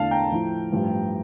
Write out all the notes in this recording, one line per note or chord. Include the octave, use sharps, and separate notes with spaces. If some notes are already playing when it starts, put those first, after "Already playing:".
Already playing: E2 D3 A3 D4 F5 A5
G5 A#5
A2 F3 A3 E4
A1 G2 F3